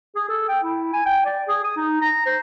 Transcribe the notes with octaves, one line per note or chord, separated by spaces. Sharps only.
G#4
A4
G5
E4
G#5
G5
D5
G#4
D#6
D#4
A#5
C5